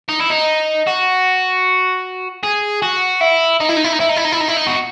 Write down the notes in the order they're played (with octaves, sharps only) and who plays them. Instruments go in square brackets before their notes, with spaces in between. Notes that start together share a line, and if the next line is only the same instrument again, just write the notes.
[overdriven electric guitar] D#4
E4
D#4
F#4
G#4
F#4
E4
D#4
E4
D#4
E4
D#4
E4
D#4
E4
D#4
E4
D#4
E4
D#4
F#4